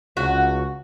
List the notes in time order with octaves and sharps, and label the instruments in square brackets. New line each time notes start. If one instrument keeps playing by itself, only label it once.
[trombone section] C#2 [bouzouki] F#4